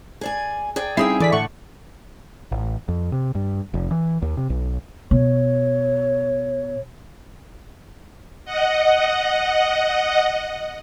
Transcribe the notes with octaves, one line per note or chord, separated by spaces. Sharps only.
G#4 D5 G#5
G#4 D5 G5
C#3 G3 C4 D#4 E4 G#4 G5 C7
D3 E3 D5 B6
A2 A3 F#5 C#6
A1
F2
C3
G2
F1
E3
D#2
C3
B1
B2 C#5
D#5 F#5